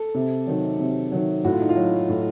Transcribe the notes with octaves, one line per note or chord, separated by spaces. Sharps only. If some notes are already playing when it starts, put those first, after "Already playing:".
Already playing: A4
C3
D#3 F#3
C3
D#3 F#3
A2 F#4
F4
D#4
F4
F#3
A2